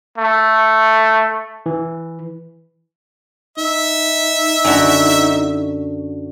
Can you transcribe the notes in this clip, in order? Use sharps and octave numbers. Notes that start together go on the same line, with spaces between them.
A3
E3
D#4 E5
F#2 D3 F#4